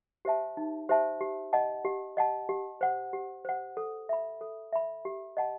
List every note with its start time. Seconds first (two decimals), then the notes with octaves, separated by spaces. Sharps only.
0.25 G4 C5 E5 A5
0.57 D#4
0.89 G4 C5 E5 A5
1.21 G4
1.53 D#5 F#5 A5
1.85 G4
2.17 D#5 F#5 A5
2.49 G4
2.81 C5 F#5
3.13 G4
3.45 C5 F#5
3.77 A4
4.09 E5 B5
4.41 A4
4.73 E5 B5
5.05 G4
5.37 D#5 F#5 A5